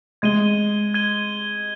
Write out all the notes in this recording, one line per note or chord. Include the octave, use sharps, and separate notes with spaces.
G#3 G#6 D#7 G7
G#6 D#7 G7